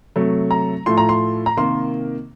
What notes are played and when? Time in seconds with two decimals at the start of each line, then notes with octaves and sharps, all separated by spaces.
0.16 C3 F#3 A3
0.51 A#5
0.86 A2 F3 A3 C6
0.98 A#5
1.09 C6
1.46 A#5
1.57 C3 D#3 A#3 C6